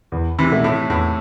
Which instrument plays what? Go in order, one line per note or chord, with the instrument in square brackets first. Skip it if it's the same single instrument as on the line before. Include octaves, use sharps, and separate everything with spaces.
[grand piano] E2
[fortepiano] C3 E3
[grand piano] B2 A3 E4
[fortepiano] A2
[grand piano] E2 [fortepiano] A2